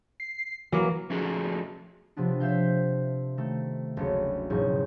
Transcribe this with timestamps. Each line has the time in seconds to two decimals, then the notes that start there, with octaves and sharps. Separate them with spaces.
0.20 C7
0.72 E3 F#3 A#3
1.10 F3 A3 C#4 D#4 F#4 G#4
2.16 C3 F3 B3 D4
2.40 C5 E5 F5 G6
3.37 D#3 A3
3.97 F#1 D2 C#3 C#7
4.50 E1 G#2 E3 F#3 C#6 G6